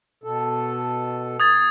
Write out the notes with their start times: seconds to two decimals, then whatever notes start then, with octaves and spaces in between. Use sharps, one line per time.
0.24 B2 A4
1.40 D#6 G#6 A6